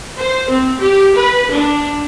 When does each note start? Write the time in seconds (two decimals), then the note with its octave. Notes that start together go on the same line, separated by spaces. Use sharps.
0.17 C5
0.50 C4
0.79 G4
1.17 B4
1.51 D4